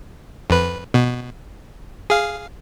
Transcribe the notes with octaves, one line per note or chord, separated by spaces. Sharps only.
F2 B4
B2
G#4 F5